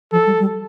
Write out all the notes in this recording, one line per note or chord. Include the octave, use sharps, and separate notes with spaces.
F3 A4
G3
G3